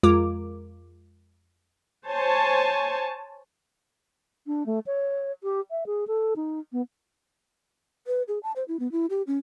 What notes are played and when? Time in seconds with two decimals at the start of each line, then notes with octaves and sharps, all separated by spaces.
0.03 F2 G#3 F4 A#4 D6
2.08 C5 C#5 G#5 A5
4.47 D4
4.66 A3
4.86 C#5
5.43 G4
5.71 E5
5.86 G#4
6.07 A4
6.36 D#4
6.72 B3
8.07 B4
8.28 G#4
8.43 A5
8.56 C5
8.68 E4
8.80 B3
8.92 E4
9.10 G4
9.27 C#4